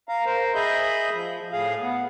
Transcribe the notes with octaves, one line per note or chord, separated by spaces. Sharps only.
F5 A#5
A#4 C5
G#4 D#5 E5 B5 G6
F3
A2 G#4 F5
B3